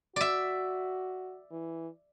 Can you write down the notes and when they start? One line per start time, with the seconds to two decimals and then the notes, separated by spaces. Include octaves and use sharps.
0.16 F#4 D5 E5
1.51 E3